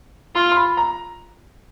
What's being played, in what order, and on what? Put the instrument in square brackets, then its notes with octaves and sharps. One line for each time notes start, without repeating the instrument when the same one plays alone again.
[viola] F4 [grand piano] C6
[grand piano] C6
B5
A#5